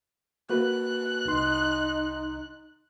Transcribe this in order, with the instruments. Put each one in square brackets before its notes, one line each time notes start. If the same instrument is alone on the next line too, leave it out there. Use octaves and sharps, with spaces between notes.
[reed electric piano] A#3 F#4 B4 [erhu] F#6
[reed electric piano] C2 C6 [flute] D#4